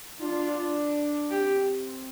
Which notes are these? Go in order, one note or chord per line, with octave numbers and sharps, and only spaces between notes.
D4 F4
C4 G4